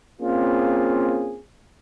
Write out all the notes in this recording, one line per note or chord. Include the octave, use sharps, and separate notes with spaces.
A#3 C4 C#4 F4 G#4